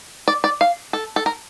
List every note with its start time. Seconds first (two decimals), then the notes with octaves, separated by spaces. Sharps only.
0.28 D5
0.44 D5
0.61 F5
0.93 A4
1.16 A4
1.26 A#4